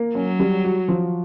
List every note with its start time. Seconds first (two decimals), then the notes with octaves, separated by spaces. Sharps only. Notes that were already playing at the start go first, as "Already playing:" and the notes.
Already playing: A#3
0.15 F#3 C#4
0.39 G3
0.65 F#4
0.88 F3